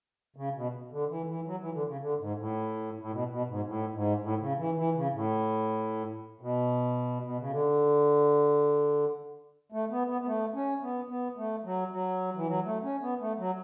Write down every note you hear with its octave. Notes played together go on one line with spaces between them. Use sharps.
C#3
B2
D3
E3
E3
F#3
E3
D3
C#3
D3
G#2
A2
A2
B2
B2
G#2
A2
G#2
A2
C#3
E3
E3
C#3
A2
B2
B2
C#3
D3
A3
B3
B3
B3
A3
C#4
B3
B3
A3
F#3
F#3
E3
F#3
A3
C#4
B3
A3
F#3